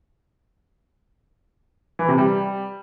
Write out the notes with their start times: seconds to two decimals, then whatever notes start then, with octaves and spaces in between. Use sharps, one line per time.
1.99 E3
2.08 C3
2.18 G3